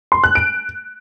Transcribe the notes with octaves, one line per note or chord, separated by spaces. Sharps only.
C6
F#6
D7